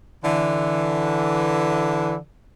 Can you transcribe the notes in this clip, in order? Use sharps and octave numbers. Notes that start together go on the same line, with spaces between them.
D3 E3